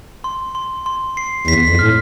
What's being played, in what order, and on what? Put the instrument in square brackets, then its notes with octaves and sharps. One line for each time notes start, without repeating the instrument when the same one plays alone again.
[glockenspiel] C6
C6
C6
C7
[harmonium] E2 [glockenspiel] B6
[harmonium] F2
[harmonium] A2 [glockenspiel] F6